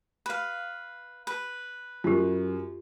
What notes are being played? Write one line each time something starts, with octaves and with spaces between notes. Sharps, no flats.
B4 F5
B4
F#2 F4 G4